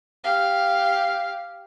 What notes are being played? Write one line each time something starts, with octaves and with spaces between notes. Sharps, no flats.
G4 F5